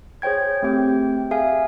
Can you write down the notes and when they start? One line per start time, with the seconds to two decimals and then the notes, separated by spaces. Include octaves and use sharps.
0.22 G#4 C5 C#5 G5 G#6
0.62 A3 C4 G4 G5
1.31 G#4 E5 F5 G#5